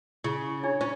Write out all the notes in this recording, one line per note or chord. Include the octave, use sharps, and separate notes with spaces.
C#3 E4
D4 E4 G#4 C#5
C#4 E4 C5